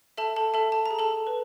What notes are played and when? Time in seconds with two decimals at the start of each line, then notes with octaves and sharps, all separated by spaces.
0.17 A4 E5 A5
0.36 A4 A5
0.54 A4 E5 A5
0.72 A5
0.86 A#5
0.91 G#4
0.99 A4 A5
1.27 B4